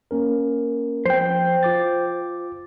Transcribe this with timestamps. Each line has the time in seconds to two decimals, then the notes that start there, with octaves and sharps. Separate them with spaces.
0.11 A#3 C#4 A#4
1.06 F3 C5 G5
1.63 F4 D6 A6